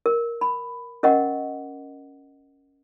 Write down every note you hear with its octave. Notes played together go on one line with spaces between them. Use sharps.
A#4
B5
C#4 A#4 D#5 F#5 C#6